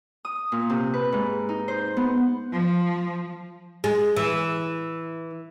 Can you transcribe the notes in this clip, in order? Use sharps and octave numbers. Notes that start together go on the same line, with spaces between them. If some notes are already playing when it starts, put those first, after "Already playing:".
D#6
A#2
C3
B4
G#2
D#4
C5
B3
F3
G#3
E3